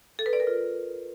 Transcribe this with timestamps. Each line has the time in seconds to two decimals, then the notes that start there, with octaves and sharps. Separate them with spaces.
0.19 A4
0.26 B4
0.33 D5
0.40 A#4
0.47 F4